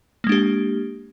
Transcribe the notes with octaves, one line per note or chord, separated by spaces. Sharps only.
G#3 A#3 D4 G4